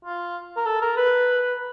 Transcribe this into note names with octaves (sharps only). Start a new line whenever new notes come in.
F4
A#4
A4
A#4
B4